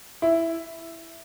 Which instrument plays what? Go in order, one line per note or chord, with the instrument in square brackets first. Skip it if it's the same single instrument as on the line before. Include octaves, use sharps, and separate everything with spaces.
[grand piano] E4